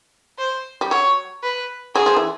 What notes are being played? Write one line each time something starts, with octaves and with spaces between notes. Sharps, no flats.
C5
G3
F#3 C#5
B4
F#3 G#4
F3
E3